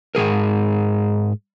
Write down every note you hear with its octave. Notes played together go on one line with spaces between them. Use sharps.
G#2 D#3 G#4 A#4